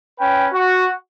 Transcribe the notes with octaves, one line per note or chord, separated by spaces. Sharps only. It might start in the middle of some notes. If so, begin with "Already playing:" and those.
C#4 B4 G5
F#4